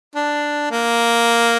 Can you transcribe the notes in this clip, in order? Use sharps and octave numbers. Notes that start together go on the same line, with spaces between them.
D4
A#3